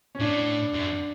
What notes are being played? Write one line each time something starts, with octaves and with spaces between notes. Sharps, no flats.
C#4
A2 D4
F#2